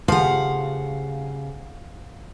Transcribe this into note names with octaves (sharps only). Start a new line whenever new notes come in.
C#3 F3 A3 G4 F5 F#5